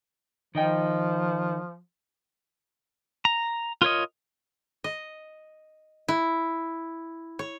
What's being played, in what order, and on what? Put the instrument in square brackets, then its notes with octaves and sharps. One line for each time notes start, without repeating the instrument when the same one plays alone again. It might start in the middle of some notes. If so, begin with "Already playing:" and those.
[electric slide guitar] D#3 D#5 G5 [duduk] F3
[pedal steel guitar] A#5
F4 A#4 C#5 D#5
[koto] D#5
E4
C#5